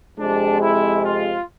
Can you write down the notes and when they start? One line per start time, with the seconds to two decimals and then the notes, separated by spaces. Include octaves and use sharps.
0.18 F2 C3 G#3 D4
0.61 E4
1.03 F4